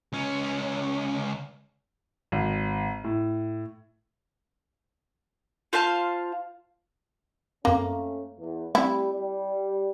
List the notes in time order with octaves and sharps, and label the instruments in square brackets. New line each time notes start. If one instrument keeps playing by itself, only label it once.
[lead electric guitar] C#2 C#4
[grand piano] G#1
A2
[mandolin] F4 C5 F5 A5
[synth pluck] F#2 C4 [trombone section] A3 C#4 [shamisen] A#3
[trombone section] E2
[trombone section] G3 [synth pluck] A3 C4 [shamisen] E4
[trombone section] G3